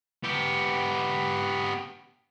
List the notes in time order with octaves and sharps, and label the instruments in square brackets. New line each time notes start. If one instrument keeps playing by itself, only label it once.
[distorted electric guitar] B3 G4